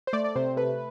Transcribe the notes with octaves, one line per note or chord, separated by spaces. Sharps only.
C5
A3 D5
D5
C3 C5
A3 B4